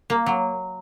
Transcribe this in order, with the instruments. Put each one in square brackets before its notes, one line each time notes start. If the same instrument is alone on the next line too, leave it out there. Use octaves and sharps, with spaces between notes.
[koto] A#3
F#3